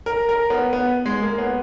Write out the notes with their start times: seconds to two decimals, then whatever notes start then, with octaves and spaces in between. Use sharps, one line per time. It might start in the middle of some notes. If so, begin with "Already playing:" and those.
0.06 A#4
0.29 A#4
0.50 B3
0.73 B3
1.06 G#3
1.22 A#3
1.38 B3